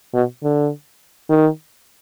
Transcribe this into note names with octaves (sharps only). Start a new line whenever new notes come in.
B2
D3
D#3